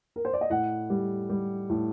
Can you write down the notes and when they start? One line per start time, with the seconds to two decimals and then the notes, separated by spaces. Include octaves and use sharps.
0.16 A#4
0.25 C5
0.33 D5
0.41 D#5
0.50 A2 F#5
0.90 G3
1.29 G3
1.70 A2